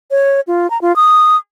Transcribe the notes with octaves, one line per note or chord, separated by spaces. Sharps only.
C#5
F4
A#5
F4
D#6